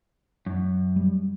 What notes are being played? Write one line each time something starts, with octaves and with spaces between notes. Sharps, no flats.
F#2
G3